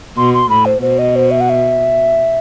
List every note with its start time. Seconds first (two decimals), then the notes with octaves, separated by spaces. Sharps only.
0.17 B2 C6
0.34 C6
0.50 A2 B5
0.66 C5
0.82 B2 C5
0.99 D#5
1.16 C5
1.31 E5
1.40 F#5
1.49 E5